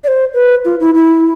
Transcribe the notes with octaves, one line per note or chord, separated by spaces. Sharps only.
D5
C5
B4
F4
E4
E4